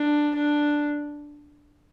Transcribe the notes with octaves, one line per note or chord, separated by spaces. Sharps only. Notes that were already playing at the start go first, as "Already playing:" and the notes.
Already playing: D4
D4